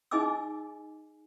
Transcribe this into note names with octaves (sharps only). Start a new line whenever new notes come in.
D#4 G#4 D#5 G#5 D6 E6